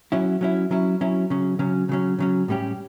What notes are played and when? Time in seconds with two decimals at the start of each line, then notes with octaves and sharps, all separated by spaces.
0.12 F#3 C#4 E4
0.41 F#3 C#4 E4
0.71 F#3 C#4 E4
1.01 F#3 C#4 E4
1.30 C#3 F#3 C#4
1.59 C#3 F#3 C#4
1.89 C#3 F#3 C#4
2.19 C#3 F#3 C#4
2.48 A2 G3 C#4 G4